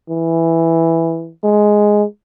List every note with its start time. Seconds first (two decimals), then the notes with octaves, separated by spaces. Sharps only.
0.09 E3
1.43 G#3